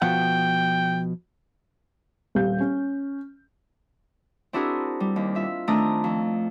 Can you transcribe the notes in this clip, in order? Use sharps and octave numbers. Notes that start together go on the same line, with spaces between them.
B2 F3 F#5 G5
D#1 G4 F5 G6
C#4
C4 D4 E4 F#4 G#4 A#4
G3
D#2
F4 E5
D#3 A3 C4 D4 A#5 D#6
F2